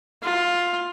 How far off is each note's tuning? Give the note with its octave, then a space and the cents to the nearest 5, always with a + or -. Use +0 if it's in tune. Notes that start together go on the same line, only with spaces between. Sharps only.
F4 +10